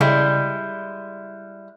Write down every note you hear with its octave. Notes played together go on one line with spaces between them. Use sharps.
C#3 G3 G#3 E4